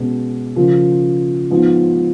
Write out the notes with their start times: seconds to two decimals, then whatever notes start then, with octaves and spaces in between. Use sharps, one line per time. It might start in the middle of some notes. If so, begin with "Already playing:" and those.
Already playing: B2 G#3 C#4
0.56 C#3 F3 A#3 F4
1.50 G#2 F3 B3